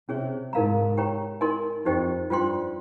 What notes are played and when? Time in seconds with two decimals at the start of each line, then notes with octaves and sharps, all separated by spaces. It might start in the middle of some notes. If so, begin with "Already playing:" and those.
0.09 C3 C#4 G#4 C#5
0.53 G#2 D#4 A#4 F5 A#5
0.97 G4 C#5 G5 A#5
1.41 D#4 A#4 D#5 G#5 C6
1.85 F2 D#4 G4 C5 D#5 G5
2.30 G2 F4 C5 G5 C6